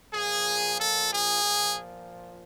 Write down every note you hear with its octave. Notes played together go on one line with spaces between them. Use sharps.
A#2 F3 G#4
A4
G#4
A#2 F3